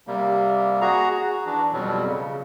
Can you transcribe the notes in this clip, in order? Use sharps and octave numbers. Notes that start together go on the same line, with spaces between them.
C3 G3 A#3
F#4 G#4 A#5
F#4
E3 D4
F2 B2 F#3 G3
C#3